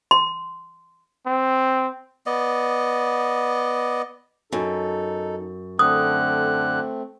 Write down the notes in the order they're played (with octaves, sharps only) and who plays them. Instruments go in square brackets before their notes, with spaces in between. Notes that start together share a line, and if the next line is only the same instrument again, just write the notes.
[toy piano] C6
[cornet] C4
[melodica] B3 D5 D#5
[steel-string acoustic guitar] F#2 [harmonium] D#4 A4
[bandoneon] D3 F#6 [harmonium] A3 C4 [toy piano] D#6